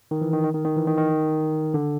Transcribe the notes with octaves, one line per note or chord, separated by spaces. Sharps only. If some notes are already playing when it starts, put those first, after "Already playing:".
D#3
E3
D#3
D#3
D#3
D#3
E3
D#3
D#3
D3